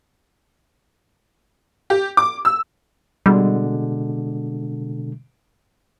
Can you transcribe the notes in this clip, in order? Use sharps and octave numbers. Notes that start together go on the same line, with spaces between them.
G4
D6
E6
B2 D3 G3 G#3